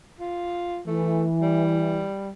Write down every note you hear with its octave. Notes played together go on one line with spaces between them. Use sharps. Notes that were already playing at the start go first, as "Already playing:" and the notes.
F4
E3 A3
G3